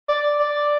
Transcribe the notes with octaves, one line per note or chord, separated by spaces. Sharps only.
D5
D5